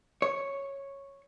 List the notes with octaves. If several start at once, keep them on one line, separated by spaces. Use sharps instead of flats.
C#5